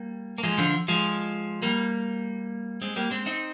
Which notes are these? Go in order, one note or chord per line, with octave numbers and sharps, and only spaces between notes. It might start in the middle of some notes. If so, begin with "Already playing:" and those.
Already playing: G3 A#3
A#3
F3 G#3
D3 F3
F3 G#3
G3 A#3
G#3 C4
G3 A#3
G#3 C4
C4 D#4